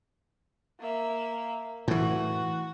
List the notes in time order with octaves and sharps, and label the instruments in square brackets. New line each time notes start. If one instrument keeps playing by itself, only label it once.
[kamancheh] A#3 E5
[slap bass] A2 E3 [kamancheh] F#4